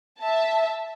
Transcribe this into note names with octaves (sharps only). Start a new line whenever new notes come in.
E5 A5